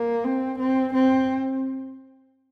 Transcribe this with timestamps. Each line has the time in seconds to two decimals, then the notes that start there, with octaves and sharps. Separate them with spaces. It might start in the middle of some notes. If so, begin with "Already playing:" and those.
Already playing: A#3
0.24 C4
0.59 C4
0.94 C4